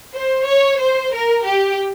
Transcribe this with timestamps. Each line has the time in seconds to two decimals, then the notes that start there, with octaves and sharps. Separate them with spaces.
0.13 C5
0.45 C#5
0.79 C5
1.13 A#4
1.46 G4